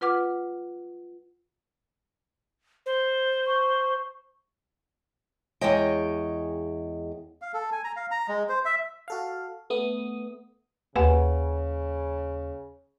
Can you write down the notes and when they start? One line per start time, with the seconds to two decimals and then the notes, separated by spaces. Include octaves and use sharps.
0.01 F4 B4 F#5 D6 F6
2.86 C5
3.47 C#6
5.61 E2 G#3 G#4 C#5 D#5 G5
7.42 F5
7.54 A4
7.72 G#5
7.84 A#5
7.96 F5
8.11 A#5
8.29 G#3
8.49 C5
8.65 E5
9.08 F#4 A4 F5
9.70 A3 B3 D#6
10.96 D#2 C#3 B4 F#5 G#5